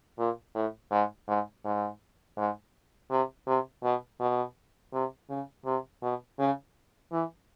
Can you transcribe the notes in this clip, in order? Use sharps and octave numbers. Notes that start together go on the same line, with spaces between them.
A#2
A2
G#2
G#2
G#2
G#2
C3
C3
B2
B2
C3
C#3
C3
B2
C#3
E3